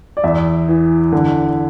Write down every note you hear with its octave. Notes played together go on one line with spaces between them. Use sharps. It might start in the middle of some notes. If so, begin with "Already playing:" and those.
D5
E2 E5
E3
D3